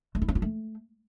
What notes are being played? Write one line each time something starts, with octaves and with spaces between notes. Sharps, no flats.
A3
E4
C#4
F4
A3